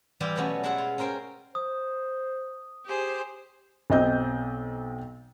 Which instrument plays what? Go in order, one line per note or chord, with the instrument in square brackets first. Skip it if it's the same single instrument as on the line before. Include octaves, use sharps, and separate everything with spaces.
[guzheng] E3 G3 E4 F4 G4
B2 F#3 A3 B3 C#4
G#3 B3 E4 B4 E5 F#5
F4
C#4 A#4 C5 G5 G#5
[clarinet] C5 [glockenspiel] D#6
[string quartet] G4 G#4 C5
[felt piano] B1 C4 D#5 G6